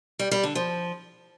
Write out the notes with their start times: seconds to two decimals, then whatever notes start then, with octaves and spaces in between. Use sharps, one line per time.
0.19 G3
0.31 G3
0.43 D3
0.55 F3